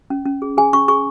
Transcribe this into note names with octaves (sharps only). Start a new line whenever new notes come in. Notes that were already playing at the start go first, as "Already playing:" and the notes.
C#4
C#4
G#4
G#4 G#5
C#4 C#6
G#4 C#6